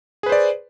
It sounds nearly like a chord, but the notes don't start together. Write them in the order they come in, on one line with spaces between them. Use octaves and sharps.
G#4 B4 C5 D5